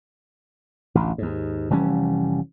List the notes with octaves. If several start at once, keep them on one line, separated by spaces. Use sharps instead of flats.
A1 D2
D#2 G#2
F1 E3 G3 C#4